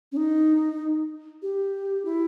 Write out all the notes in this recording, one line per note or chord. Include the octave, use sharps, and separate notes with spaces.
C#4
D#4
G4
E4